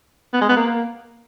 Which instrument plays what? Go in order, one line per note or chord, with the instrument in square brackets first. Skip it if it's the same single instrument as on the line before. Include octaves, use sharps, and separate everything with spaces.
[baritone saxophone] B3
G#3
B3
A#3